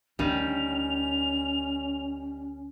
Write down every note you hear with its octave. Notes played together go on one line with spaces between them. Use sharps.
D2 D#3 G3 C#4 D4 F7